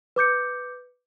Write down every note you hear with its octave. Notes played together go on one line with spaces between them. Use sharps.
B4 D6 G6 C#7